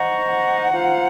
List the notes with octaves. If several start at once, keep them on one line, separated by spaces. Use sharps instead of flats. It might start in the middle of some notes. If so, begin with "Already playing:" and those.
Already playing: C5 D#5 F#5 A#5 C#6
F#5
F4 C5 F5 A#5